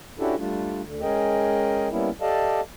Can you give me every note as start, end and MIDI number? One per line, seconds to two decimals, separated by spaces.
0.19 0.35 61
0.19 0.35 62
0.19 0.35 64
0.19 0.35 66
0.19 0.35 67
0.19 0.35 69
0.38 0.82 55
0.38 0.82 57
0.38 0.82 62
0.38 0.82 65
0.85 1.02 38
0.85 1.02 50
1.02 1.88 56
1.02 1.88 61
1.02 1.88 68
1.02 1.88 70
1.02 1.88 75
1.02 1.88 79
1.91 2.10 55
1.91 2.10 58
1.91 2.10 59
1.91 2.10 61
1.91 2.10 64
2.21 2.60 67
2.21 2.60 69
2.21 2.60 74
2.21 2.60 75
2.21 2.60 77
2.21 2.60 81